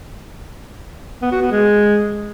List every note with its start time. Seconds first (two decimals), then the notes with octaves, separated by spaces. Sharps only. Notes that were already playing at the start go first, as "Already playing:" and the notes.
1.22 B3
1.32 F#4
1.42 B3
1.51 G#3